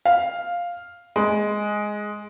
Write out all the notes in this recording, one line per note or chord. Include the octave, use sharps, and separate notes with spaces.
F5
G#3